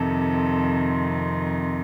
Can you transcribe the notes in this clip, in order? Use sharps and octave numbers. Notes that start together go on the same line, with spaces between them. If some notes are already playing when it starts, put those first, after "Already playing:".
Already playing: F2 C3 D#3 A4